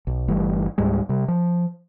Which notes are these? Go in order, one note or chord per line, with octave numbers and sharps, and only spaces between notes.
B1
G1 E3 G3 A3
C#2 G#2 G3 G#3
C3 G3
F3